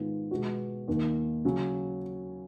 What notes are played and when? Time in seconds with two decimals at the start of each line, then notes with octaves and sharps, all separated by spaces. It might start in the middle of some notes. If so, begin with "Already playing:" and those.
Already playing: G#2 D#3 G#3 B3 F4
0.31 B2 G#3 B3 F#4
0.88 D#2 D#3 A#3
1.45 C#3 F#3 C#4